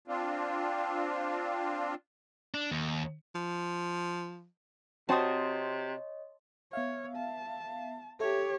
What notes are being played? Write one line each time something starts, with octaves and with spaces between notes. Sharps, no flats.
C4 D4 F4
D4
D#2
F3
C3 C4 F#4 C#5 D#5 A5 C6 D#6
B3 C#5 E5 F5
A5
G4 A4 C#5 E5 C#6